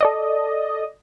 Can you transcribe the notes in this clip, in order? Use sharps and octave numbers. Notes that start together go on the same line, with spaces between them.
A4 D5 D#5